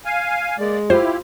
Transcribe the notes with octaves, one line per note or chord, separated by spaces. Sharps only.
F5 G#5
G#3 A#3 D5
E4 F4 G4 C5